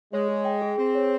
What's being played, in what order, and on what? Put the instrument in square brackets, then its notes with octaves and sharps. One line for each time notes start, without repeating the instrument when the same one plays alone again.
[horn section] G#3 [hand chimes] C#5
[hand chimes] G#4
G5
G#4
[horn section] C4 [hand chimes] G#4
[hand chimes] C#5